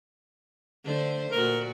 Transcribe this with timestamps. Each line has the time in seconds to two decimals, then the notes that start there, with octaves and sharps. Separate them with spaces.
0.84 D3 A3 C5
1.32 A#2 F#4 A#4